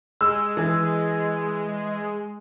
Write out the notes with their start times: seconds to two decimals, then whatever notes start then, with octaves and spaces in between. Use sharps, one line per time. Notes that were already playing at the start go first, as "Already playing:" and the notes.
0.21 G#3 E6
0.57 E3